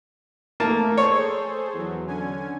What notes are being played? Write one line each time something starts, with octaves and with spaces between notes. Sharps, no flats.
A3 A#3 A4 A5
G#4 A4 C5 C#5
E2 F#3
D3 C#4 G#5